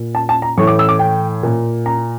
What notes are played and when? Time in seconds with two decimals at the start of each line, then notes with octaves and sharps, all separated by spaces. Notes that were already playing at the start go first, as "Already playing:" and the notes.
Already playing: A#2
0.15 A5
0.29 A5
0.42 A#5
0.58 A2 E3 C#6
0.67 D6
0.79 E6
0.89 D6
0.99 G5
1.43 A#2
1.86 A#5